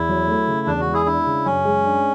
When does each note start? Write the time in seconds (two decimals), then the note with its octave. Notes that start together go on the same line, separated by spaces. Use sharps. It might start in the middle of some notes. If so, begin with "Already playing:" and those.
Already playing: E2 E4
0.09 F#3
0.28 A3
0.47 C#3
0.67 E2 D4
0.80 F#4
0.87 G#3
0.93 E4 G#4
1.06 D4 E4
1.26 C#3
1.45 F#2 C#4
1.65 G#3
1.85 D4